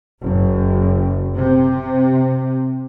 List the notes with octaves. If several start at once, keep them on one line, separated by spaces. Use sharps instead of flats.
F#1
C3